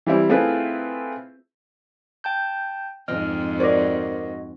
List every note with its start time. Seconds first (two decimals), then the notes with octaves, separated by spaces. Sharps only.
0.06 E3 G3 C4 E4
0.29 A3 C4 E4 F4 G#4 B4
2.24 G5 A5 G6
3.08 F2 G#2 D#5 G5 F6
3.60 F#4 A#4 C5 D5 D#5